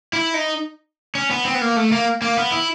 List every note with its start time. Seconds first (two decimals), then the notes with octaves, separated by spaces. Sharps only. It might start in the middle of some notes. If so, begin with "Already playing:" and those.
0.13 E4
0.34 D#4
1.15 C#4
1.31 B3
1.45 C4
1.55 B3
1.61 A#3
1.76 A3
1.92 A#3
2.22 A#3
2.37 B3
2.52 E4